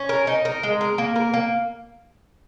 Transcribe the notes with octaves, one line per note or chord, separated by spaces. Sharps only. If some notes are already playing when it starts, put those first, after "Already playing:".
Already playing: C#4
A#4
D#4
A#4
G#3
A#4
A#3
A#4
A#3